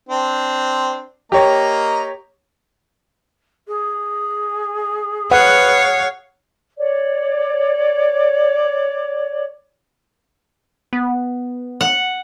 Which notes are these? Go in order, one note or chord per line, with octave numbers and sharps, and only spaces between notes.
C4 D4
A#3 G4 C#5 D#5 A#5
G#4
B4 C#5 F5 F#5
C#5 D5
B3
F#5